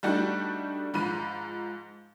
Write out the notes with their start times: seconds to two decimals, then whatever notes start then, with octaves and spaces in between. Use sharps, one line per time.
0.03 G3 A3 D4 D#4 F#4 G4
0.94 G#2 F3 B5 D#7